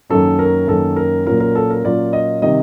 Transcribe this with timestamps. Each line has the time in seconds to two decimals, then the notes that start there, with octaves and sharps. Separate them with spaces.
0.10 F#2 D#3 F#3 A#3 C#4 A4
0.39 A#4
0.67 F#2 D#3 F#3 A#3 C#4 A4
0.96 A#4
1.26 A#2 F#3 A#3 C#4 F4 A#4
1.40 A#4
1.55 A4
1.70 A#4
1.84 A#2 F#3 A#3 C#4 F4 D5
2.13 D#5
2.42 C3 D#3 G3 D#5